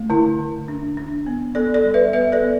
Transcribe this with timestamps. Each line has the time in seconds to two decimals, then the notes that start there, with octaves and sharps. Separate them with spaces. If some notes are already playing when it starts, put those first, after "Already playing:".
Already playing: A3
0.10 D3 E4
0.39 D3
0.68 D4
0.97 D4
1.26 B3
1.55 B3 A4 D5
1.74 A4 D5
1.84 G3
1.94 B4 E5
2.13 B3 B4 E5
2.32 A4 D5
2.42 B3